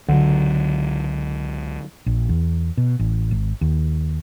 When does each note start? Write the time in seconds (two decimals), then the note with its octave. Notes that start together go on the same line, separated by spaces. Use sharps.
0.09 C#2 D3 F#3
2.06 A#1
2.29 E2
2.77 B2
2.99 A1
3.31 G#1
3.61 D#2